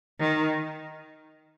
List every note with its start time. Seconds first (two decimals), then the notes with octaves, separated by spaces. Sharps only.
0.19 D#3